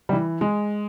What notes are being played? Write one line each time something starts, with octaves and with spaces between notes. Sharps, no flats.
G3
E3
G#3